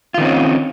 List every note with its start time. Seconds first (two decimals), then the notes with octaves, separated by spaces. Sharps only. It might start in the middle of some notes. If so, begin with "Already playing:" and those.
0.14 F4
0.18 D#3
0.21 C4
0.24 C#4